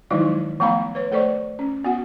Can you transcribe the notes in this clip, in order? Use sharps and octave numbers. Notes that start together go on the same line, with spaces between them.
D#3 F3 F#3 G#3 D#4 E4
F3 A3 B3 F5 A#5 B5
B4 C#5
A3 A4 C5 D5 C#6
C#4
B3 F#4 F#5